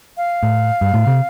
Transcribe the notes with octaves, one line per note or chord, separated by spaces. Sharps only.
F5
A2
G2
A2
C3